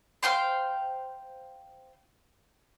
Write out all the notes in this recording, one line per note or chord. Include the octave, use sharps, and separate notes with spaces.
C5 F5 G5 C6